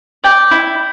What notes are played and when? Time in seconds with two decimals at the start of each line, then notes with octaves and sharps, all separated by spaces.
0.24 D5 G5
0.51 E4